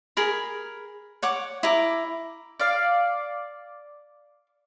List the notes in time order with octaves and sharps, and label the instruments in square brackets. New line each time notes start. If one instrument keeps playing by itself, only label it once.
[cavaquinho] G#4 A#4 B5
C#5 F#5 D6
E4 A#5 D6
[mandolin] D5 F5